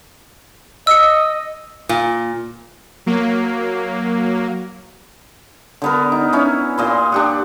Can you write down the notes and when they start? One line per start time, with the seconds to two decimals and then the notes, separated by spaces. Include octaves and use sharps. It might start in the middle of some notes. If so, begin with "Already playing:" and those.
0.87 D#5 E6 C#7
1.89 A#2
3.06 F#3 A#3
5.82 D3 B3 A#4
6.12 D#4
6.33 C#4 E4
6.78 A#2 D#5 C6
7.12 D4 G4 F#5